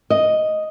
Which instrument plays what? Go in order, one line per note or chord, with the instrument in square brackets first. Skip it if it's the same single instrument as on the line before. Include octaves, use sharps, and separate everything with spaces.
[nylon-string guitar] D#5